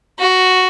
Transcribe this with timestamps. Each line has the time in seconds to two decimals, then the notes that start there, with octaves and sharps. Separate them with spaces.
0.19 F#4